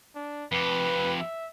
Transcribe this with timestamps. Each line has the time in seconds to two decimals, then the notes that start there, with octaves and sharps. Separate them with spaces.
0.15 D4
0.52 F2 G4 B4
1.20 E5